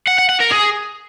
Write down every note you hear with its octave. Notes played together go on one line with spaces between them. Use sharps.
F#5
F#5
F#5
A#4
G#4